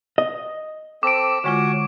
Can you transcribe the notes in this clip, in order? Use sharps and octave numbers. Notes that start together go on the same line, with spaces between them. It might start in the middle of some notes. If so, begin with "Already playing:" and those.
D#5
C4 A4 D6 D7
D3 G#3 F4 F#4 C#5